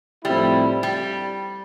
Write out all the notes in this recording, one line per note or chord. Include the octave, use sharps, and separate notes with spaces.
A2 F3 G3 A3 C4 E4
G3